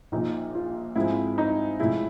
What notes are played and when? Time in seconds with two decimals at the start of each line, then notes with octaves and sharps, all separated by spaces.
0.12 A#1 A#2 F3 D#4
0.55 F4
0.95 G#2 F3 G#3 C4 E4
1.38 D#4
1.79 A2 F3 G#3 E4